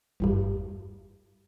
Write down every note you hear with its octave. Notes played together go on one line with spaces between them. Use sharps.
G1 E2 G2